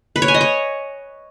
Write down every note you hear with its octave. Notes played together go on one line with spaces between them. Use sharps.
B4
C#5
G#5
D#5
C#5